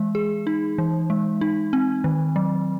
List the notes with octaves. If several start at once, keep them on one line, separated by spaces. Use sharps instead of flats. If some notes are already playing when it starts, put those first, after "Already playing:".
Already playing: E3 G#3
G#4
D#4
E3
G#3
D#4
C4
D#3
F#3